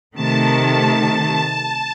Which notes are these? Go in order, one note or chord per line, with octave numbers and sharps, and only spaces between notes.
C3 D#3 A3 A5
A5